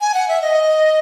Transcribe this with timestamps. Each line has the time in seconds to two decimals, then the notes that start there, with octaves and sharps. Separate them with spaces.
0.01 G#5
0.14 F#5
0.28 E5
0.42 D#5